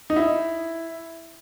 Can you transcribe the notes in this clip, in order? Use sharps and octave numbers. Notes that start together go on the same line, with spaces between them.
D#4
E4